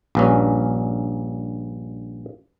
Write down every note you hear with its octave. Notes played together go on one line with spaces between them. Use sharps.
A#1 G2 C#4